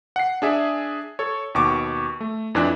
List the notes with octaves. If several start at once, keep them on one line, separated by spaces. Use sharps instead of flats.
F#5 C7
D4 G#4 E5
A4 C#5
D#2 B2 C#6 D6
A3
F2 E3 D4 E4 F#6